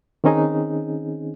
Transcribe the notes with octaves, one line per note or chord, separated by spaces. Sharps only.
D#3 C4 C#4 D#4 G#4